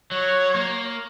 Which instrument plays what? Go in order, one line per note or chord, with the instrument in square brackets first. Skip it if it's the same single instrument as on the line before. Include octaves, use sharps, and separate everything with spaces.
[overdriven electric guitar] F#3 [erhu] C#5
[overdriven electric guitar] A#3